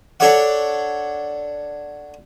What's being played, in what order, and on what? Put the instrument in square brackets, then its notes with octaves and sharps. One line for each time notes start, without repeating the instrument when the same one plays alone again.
[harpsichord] D4 A4 C#5 D5 F#5